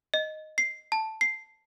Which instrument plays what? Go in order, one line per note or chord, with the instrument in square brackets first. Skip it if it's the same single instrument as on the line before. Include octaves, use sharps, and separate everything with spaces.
[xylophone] D#5
C7
A5
C7